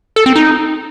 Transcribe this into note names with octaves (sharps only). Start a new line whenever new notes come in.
A4
C4
D#4